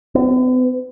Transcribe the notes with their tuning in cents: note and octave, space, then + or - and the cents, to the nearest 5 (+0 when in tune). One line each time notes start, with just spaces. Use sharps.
B3 +45